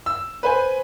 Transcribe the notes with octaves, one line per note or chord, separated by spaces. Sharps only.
E6
B4 C5 G#5